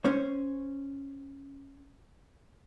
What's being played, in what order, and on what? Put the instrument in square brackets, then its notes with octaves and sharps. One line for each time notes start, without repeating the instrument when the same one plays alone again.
[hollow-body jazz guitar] C#4 C5 C#5